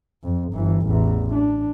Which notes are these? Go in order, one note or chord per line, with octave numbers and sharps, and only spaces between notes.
F2
G1 E3
A1 E2
D4